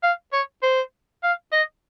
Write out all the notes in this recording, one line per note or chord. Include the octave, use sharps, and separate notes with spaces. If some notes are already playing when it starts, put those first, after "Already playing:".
F5
C#5
C5
F5
D#5